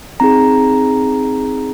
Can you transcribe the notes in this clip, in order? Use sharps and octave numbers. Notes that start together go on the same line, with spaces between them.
C4 D#4 G#4 A#5